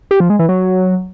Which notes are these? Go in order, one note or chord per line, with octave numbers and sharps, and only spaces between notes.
G4
F3
G#3
E3
F#3